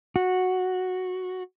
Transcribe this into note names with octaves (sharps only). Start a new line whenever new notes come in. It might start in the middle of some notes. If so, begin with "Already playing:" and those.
F#4